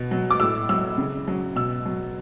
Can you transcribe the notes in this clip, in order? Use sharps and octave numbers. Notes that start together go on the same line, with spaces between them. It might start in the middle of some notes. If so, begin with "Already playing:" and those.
Already playing: B2
F#3
D6
A2 E6
F#3 E6
C#3
F#3
B2 E6
F#3